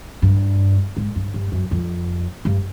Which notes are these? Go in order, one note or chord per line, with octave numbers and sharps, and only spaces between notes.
G2
G#2
G2
G2
F#2
F2
G2